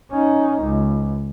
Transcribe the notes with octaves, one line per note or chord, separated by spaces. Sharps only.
C#4 D#4
C#2